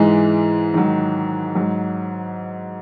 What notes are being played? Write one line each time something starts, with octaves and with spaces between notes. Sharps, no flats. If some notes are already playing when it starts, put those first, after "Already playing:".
Already playing: G#2 E3 G#3
G#2 D#3 F#3
G#2 F#3